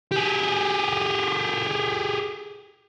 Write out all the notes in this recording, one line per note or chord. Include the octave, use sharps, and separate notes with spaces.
G4 G#4